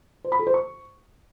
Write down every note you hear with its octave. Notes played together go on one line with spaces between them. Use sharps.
C5
B5
A4
C5
C#6